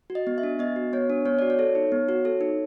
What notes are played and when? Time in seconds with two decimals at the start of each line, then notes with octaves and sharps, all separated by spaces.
0.10 F#4
0.15 D#5
0.27 B3
0.38 E5
0.43 D4
0.59 B3 D#5
0.76 F#4
0.93 B3 C#5
1.10 D4
1.25 B3 C#5
1.39 F#4 D5
1.50 C#5
1.59 A4
1.75 D#4
1.92 B3
2.09 F#4
2.25 A4
2.41 D#4